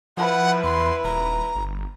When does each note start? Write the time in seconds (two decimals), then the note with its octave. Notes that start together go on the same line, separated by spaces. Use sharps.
0.17 F3 E4 B4 F#5
0.64 E2 C6
1.04 D#1 A#5
1.55 G1